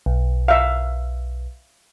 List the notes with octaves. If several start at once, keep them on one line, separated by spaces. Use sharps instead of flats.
B1
E5 F5